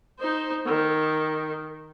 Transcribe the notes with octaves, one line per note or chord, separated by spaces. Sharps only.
D#4 C5
D#3